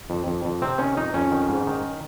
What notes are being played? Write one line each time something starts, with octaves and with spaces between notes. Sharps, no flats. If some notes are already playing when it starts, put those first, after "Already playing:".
F2
F2
F2
C3 C4
D#3 C#4
F2 D#4
F2 C#4
D#3
G#2
D#3